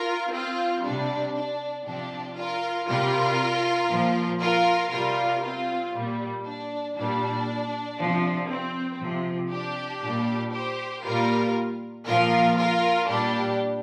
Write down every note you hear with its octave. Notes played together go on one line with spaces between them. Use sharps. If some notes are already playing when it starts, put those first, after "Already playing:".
Already playing: F4 A#4
C4 F4
C3 G3 D4
D4
C3 F3 D4 G4
F4 A#4
C3 G3 F4 A#4
A#2 F3
F4 A#4
C3 G3 F4 A#4
C4 F4
A#2 G3
D4
A#2 G3 D4
C3 F3
C4
C3 F3
D4 G4
A#2 G3
G4 C5
A#2 G3 F4 A#4
A#2 F3 F4 A#4
F4 A#4
A#2 G3 D4 G4